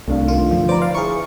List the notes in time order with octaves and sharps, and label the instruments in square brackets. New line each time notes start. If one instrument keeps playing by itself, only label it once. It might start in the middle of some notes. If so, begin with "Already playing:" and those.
[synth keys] C2 [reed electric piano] A3 D4 F5
[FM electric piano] D#3 F4
[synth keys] G2 D3 F3
[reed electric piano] B4 A#5 [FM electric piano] C5 [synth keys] D5
[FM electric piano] F5
[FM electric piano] E4 G#4 [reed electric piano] B4 [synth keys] C#6